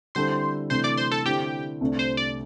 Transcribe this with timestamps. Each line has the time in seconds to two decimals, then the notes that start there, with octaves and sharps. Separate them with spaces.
0.15 D3 G3 C4 E4 A4 C5 C6
0.70 C3 E3 A3 D4 C5 C6
0.84 D5 D6
0.97 C5 C6
1.12 A4 A5
1.26 D3 C4 E4 G4 G5
1.81 C2 C3 A3 D4
1.99 C5
2.17 D5